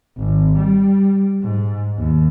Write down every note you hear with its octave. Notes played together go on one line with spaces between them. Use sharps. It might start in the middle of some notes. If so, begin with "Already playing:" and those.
G#1
G3
G#2
D#2